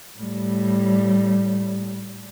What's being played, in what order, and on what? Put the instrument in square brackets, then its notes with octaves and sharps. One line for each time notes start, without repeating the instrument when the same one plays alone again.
[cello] A2 G3